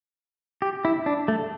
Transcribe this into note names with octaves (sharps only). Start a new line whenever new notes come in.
G4
E4
D4
A3